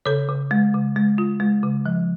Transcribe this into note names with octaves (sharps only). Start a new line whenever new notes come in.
C#3 A4 C#5
C#3
G#3
C#3
G#3
F4
G#3
C#3
F3